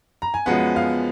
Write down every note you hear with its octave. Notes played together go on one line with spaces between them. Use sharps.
A#5
G#5
F#2 F3 G#3 B3 F#5
F5